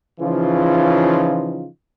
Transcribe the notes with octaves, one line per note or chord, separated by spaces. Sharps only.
C#3 E3 F3 C#4 D#4 F4